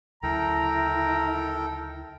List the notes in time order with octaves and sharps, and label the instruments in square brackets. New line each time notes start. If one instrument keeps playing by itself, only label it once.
[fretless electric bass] D2 C#3 F#3 [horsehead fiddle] E4 [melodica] A4 A#4 G5 [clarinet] A#5